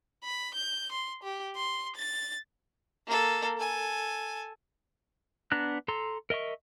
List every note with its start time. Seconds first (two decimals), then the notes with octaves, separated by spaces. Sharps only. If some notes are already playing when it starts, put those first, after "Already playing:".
0.23 B5
0.55 G6
0.92 C6
1.23 G4
1.56 C6
1.96 A6
3.07 A#3 A4
3.59 A4 G#5
5.52 B3 D4 A#5 F#6
5.88 A4 A#5 C6
6.30 A#4 D#5 E5 C#6